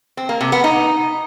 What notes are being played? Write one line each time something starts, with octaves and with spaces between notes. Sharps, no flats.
C4
A#3
C3
B3
D#4